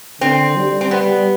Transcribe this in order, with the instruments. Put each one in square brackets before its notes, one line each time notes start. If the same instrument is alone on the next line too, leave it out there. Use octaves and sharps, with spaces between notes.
[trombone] D3 [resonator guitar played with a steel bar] C4
[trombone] G3
[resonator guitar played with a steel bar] C4
B3